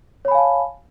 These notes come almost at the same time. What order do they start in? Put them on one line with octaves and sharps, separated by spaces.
C#5 B5 G#5 F5 A5